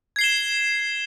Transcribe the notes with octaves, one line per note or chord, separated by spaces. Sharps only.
G#6 C7 E7 G7